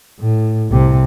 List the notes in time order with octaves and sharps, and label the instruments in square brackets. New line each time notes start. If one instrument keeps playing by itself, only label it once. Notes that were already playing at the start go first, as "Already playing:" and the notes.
[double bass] A2
C2 C3